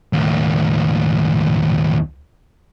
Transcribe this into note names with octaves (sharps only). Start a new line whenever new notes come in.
D#2 A2